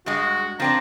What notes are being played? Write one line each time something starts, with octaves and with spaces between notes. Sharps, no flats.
G2 G#3 F#4
F3 C4 D4 A#5